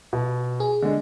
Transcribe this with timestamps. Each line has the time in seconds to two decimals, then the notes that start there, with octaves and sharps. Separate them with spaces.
0.13 B2
0.60 G#4
0.82 D3 G#3